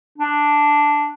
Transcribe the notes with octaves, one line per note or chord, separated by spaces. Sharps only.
D4